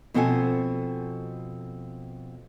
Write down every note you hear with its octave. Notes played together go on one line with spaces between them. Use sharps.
B2 F3 C4 A4 F#5 G#5